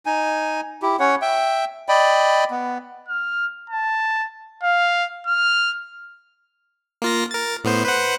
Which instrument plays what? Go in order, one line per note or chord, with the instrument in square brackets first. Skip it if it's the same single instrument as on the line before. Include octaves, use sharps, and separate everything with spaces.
[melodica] D#4 G#5
E4 G4
C#4 C#5 F#5
E5 G5
D5 D#5 G5 B5
B3
[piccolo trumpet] F6
A5
F5
F6
[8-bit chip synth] A#3 F4 A#6
A#4 A6
A2 B3 C5
B4 C5 F#5